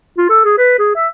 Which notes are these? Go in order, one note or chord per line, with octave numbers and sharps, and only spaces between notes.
F4
A4
G#4
B4
G#4
E5